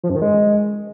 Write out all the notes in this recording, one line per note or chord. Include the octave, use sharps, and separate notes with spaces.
F3
F#2
D#3
G#3